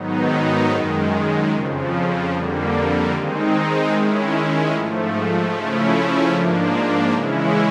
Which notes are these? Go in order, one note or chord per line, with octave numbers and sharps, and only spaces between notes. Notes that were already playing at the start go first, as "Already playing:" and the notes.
Already playing: G#2 D#3 F#3 B3 D#4
F#2 D#3 G#3
F2 C#3 F3
F2 D3 G3 A#3
D#3 G#3 C4 D#4
D#3 G#3 C#4 E4
G#2 F3 A3
C#3 F3 A3 C#4 E4
G#2 F3 A#3 D4
C#3 E3 G#3 C#4 E4